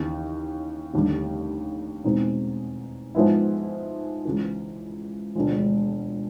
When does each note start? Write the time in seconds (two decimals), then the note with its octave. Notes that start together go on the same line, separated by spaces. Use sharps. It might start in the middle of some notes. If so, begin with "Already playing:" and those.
Already playing: D#2 C#3 E3
0.94 F1 D#2 D3 G3
2.04 E2 B2 G#3 C4 D#4
3.15 G#2 F3 G#3 B3 E4
4.25 C#2 C#3 E3
5.35 E1 D2 D3 F3 G#3